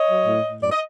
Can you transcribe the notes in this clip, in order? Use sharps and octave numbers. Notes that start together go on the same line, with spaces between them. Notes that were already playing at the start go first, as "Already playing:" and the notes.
Already playing: C#5 D#5
F#3
A2
A2
F#2 D5
D#5